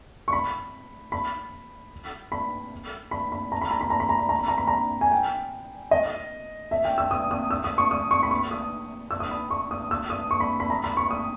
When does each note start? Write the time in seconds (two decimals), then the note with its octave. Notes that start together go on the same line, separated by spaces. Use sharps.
0.28 C#6
0.33 B5
1.12 B5
2.32 B5
3.11 B5
3.32 B5
3.52 A#5
3.61 B5
3.71 A#5
3.81 B5
3.90 A#5
4.00 B5
4.09 A#5
4.19 B5
4.29 A#5
4.39 B5
4.48 A#5
4.58 B5
4.68 A#5
5.01 G#5
5.11 G5
5.91 D#5
6.71 E5
6.85 G5
6.98 E6
7.11 D#6
7.31 D#6
7.51 E6
7.64 D#6
7.78 C#6
7.91 D#6
8.11 C#6
8.23 B5
8.31 C#6
8.51 D#6
9.11 E6
9.20 D#6
9.31 B5
9.51 C#6
9.71 D#6
9.91 E6
10.10 D#6
10.31 C#6
10.40 B5
10.60 B5
10.70 A#5
10.84 B5
10.97 C#6
11.11 D#6